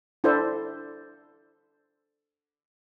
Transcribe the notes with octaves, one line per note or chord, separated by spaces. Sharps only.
D4 E4 A4 C5